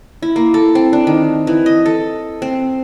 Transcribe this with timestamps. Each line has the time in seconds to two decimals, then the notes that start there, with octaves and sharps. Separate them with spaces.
0.22 E4
0.36 A#3
0.54 A4
0.75 C4
0.93 D4
1.07 D#3
1.47 E3
1.66 D#5
1.86 A4
2.42 C4